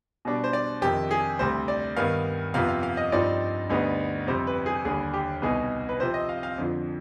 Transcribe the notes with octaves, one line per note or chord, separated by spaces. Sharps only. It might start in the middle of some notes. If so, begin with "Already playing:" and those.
B2 G3 D4
C5
D5
F2 C3 D#3 G4
G#4
D2 C3 G3 C5
D5
G2 D#3 B3 F5
F2 C3 F3 B3 F5
F5
F5
D#5
G2 F3 C4 D#4 D5
D2 D3 G3 B3 D#4
F2 C3 G3 C5
B4
G#4
D#2 D3 G3 G#4
G4
C2 B2 B3 D#4 G#4
B4
C3 F3 C4 C5
D#5
F5
F5
F2 D3 F3